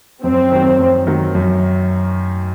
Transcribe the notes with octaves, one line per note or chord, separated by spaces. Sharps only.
F#2 C4
D#3 F#3
F#2
D#3 F#3
F#2